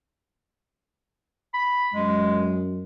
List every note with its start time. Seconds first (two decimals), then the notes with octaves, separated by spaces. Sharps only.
1.54 B5
1.94 F#2 G#3